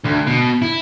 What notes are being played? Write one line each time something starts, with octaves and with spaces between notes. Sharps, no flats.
D2
B2
E4